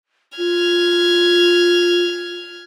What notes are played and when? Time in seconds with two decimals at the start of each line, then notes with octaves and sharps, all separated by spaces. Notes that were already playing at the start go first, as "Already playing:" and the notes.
0.38 F4 F6 G#6